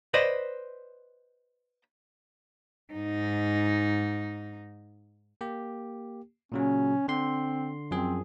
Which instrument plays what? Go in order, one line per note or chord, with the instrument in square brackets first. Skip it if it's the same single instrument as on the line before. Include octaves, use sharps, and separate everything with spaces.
[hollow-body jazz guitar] B4 C5 D5 D#5
[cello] G#2 D#4
[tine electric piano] A#3 G4
[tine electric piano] A#2 C#3 F#3 [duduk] C#4
[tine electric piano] D3 C6 [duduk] C4
[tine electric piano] F#2 F3 G#4 [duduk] C4